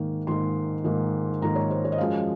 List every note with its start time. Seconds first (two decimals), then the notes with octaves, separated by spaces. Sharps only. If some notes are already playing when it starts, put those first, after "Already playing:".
Already playing: G#2 D#3 A#3
0.27 G#2 D#3 A#3 C6
0.84 G#2 D#3 A#3
1.41 G#2 D#3 A#3 A#5
1.56 C#5
1.70 C5
1.85 C#5
1.92 D#5
1.98 F#2 F3 G#3 F5